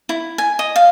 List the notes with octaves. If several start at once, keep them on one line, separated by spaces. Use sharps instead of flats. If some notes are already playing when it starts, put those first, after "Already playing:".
E4
G#5
D#5
F5